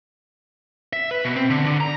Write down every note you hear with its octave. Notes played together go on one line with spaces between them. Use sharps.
E5
B4
B2
C4
D3
D3
A#5